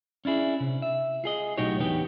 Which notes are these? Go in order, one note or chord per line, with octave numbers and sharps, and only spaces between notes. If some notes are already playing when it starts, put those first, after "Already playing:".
C#4 D4 E4 G#4
C3
E5
F4 G#4 D#5
B1 A2 D#4 F#4 G4 C#5
E2 B3 D4 D#4 G4 G5